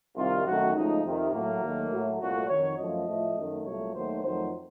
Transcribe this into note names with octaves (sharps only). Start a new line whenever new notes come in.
C2 C3 D#3 F4
F#2 D#3 A3 F#4
C#2 C#3 F3 A3 D#4
F2 C3 D#3
A2 F#3 A3 A#3
D#2 D#3 F#3 A3
A2 F#3 A3
C2 A#2 A3 F#4
F2 D#3 F#3 C#5
F#2 F3 A3 D#5
A2 F3 A3
F#2 D#3 F#3 A3
C2 A#2 F#3 A3 C#5
D#2 D#3 F#3 A3 C5
F2 D#3 F#3 A3 C5